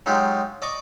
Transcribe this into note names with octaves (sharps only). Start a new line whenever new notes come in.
F#3 G#3 D#4 F4 G4
D5 D#5 A#5 C#6 D6